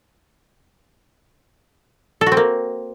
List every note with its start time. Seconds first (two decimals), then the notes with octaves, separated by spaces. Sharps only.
2.21 A4
2.26 F#4
2.32 C4
2.37 A#3